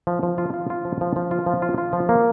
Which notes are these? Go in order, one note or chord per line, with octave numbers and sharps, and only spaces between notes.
F3
F3
F4
F4
F4
F3
F3
F3
F4
F3
F4
F4
F3
A#3